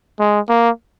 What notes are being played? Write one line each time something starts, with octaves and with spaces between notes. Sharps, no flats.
G#3
A#3